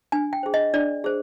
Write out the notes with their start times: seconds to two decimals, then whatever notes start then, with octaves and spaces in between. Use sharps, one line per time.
0.12 D4 G#5
0.33 G5
0.43 G#4 C5
0.54 D#5
0.74 D4 D5
1.04 G#4 C5